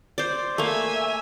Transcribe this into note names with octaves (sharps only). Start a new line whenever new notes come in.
C5 D5
A3 A#3 E5 G#5